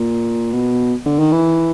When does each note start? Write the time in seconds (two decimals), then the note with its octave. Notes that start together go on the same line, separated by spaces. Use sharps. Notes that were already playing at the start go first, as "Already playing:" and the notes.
Already playing: A#2
0.53 B2
1.06 D3
1.19 D#3
1.32 E3